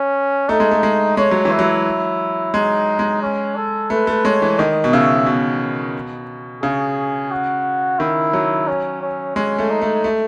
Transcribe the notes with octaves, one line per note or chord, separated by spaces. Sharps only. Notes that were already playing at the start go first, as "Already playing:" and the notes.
Already playing: C#4
A3 D#4
G#3
A3
G#3
G#3 C#5
F#3
E3
E4
F#3
G#3 D#4
G#3
C#4
A4
A3 B4
A3
G#3 C#5
E3
D#3 D#5
B2
C#3 E5
B2
C#3 G#4
F#4
D#3 E4
F#3
C#4
C#4
G#3 C#4
A3
D#4
A3
A3